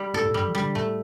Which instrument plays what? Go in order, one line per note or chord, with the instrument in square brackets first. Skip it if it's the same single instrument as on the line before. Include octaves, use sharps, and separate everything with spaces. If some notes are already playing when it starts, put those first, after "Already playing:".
Already playing: [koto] G3
[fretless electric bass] A2 [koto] A4
[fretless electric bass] A2
[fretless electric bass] G2 [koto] G3
[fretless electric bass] F3
[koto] G3
[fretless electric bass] D3
[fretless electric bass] A2 [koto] A3